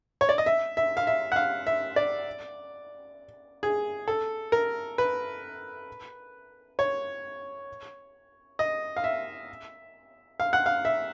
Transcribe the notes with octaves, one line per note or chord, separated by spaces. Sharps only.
C#5
D5
D#5
E5
E5
F5
E5
F#5
F5
E5
D5
G#4
A4
A#4
B4
C#5
D#5
F5
E5
F5
F#5
F5
E5